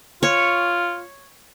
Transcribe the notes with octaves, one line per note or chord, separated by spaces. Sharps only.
F4 C#5